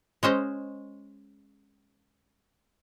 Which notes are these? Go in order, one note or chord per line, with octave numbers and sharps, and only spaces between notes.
G#3 C#4 C5 D#5